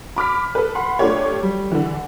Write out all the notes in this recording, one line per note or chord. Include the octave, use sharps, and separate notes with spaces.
B5 D6 F6 B6
A4 B4
F#5 B5 C6
A3 D4 F4 G4 C#5
G3
D3 E3